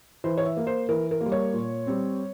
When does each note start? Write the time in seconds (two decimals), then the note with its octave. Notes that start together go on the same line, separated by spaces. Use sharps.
0.24 E3 C5
0.37 C#5
0.45 E5
0.57 A#3
0.67 C5
0.89 E3 A#4
1.11 A#4
1.21 A#3
1.26 G3
1.32 C#5
1.53 A#2
1.87 G3 C4